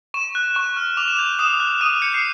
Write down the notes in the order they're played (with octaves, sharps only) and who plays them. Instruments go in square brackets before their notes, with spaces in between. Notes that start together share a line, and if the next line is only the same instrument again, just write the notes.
[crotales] C#6 E7
F#6
C#6 E7
F6
D6 F7
E7
G6 F7
D#6 E7
F#6
D#6 D#7
G6 C#7
C7